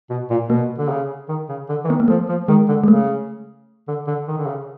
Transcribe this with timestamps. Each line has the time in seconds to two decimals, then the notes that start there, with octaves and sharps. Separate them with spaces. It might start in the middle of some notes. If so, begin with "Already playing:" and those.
0.10 B2
0.30 A#2
0.49 B2 A#3
0.78 D3
0.89 C#3
1.29 D#3
1.49 C#3
1.69 D3
1.84 E3
1.88 D#3 B3
2.00 A#3
2.08 F3 A3
2.29 F3
2.48 D#3 G#3
2.68 D3
2.84 G#3
2.88 C#3 A3
3.88 D3
4.07 D3
4.28 D#3
4.38 D3
4.47 C#3